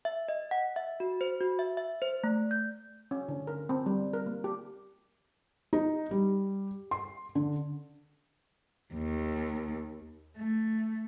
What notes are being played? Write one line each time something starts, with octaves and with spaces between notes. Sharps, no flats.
E5
D#5
F#5
E5
F#4
C5
F#4
E5
E5
C5
A3
G6
C#4
D3
A#4
C4
G3
A#4
A#3
G4
D#4
G3
C6
D3
D#2
A3